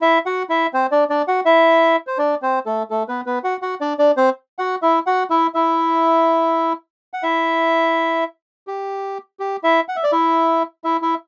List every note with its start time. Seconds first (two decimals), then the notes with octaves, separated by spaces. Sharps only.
0.01 E4 E5
0.26 F#4 F#5
0.49 E4 E5
0.73 C4 C5
0.91 D4 D5
1.10 D4 D5
1.28 F#4 F#5
1.46 E4 E5
2.07 C5
2.18 D4 D5
2.42 C4 C5
2.66 A3 A4
2.90 A3 A4
3.08 B3 B4
3.26 B3 B4
3.44 F#4 F#5
3.62 F#4 F#5
3.81 D4 D5
3.99 D4 D5
4.17 C4 C5
4.58 F#4 F#5
4.82 E4 E5
5.06 F#4 F#5
5.30 E4 E5
5.54 E4 E5
7.13 F#5
7.23 E4 E5
8.67 G4
9.40 G4
9.64 E4 E5
9.88 F#5
9.96 E5
10.03 D5
10.12 E4 E5
10.84 E4 E5
11.02 E4 E5